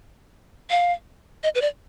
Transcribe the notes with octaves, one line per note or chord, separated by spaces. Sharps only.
F5
D#5
B4
D5